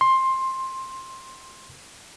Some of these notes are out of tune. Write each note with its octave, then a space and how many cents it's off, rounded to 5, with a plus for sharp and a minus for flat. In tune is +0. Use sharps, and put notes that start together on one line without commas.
C6 +15